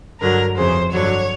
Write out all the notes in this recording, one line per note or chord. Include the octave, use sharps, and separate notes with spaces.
G2 D3 F#3 A#4
F2 C#3 E3 C5
G2 D3 F#3 C#5